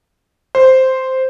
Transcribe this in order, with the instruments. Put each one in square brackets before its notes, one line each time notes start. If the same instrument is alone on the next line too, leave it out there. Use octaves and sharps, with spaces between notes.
[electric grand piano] C5